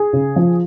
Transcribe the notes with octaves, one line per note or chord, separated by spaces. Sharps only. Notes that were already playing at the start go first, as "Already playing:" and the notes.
Already playing: G#4
C#3
F3